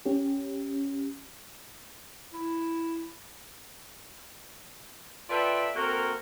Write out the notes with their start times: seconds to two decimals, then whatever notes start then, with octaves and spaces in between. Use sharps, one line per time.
0.05 C#4 G4
2.33 E4
5.29 F4 A4 B4 D5 E5 G5
5.76 A#3 C4 F#4 A4 A#4